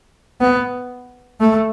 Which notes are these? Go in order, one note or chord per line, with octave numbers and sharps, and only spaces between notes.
B3
A3